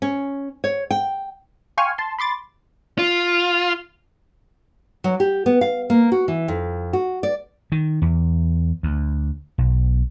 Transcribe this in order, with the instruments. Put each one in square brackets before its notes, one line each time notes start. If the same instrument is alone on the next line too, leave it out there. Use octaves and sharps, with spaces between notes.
[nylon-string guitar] C#4
C#5
G5
[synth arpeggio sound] F5 G5 G#5 C6 C#6 F6
A5 C6
B5 C6 D6 A6
[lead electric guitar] F4
[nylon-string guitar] F#3
G4
B3
F5
A#3
F#4
E3
F2
F#4
D5
[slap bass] D#3
E2
D2
B1